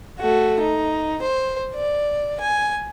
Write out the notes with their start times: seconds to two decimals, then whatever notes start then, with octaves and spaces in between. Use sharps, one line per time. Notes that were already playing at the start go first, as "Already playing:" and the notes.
0.19 A3 F#4
0.60 D#4
1.23 C5
1.75 D5
2.41 G#5